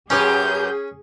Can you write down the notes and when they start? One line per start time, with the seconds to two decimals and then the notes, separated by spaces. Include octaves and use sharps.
0.10 F#2 C#4 G4 G#4 B4 G6